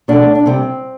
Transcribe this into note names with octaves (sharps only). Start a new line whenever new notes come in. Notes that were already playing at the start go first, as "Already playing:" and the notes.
B2 A3 D4
D4
C3 G3 C4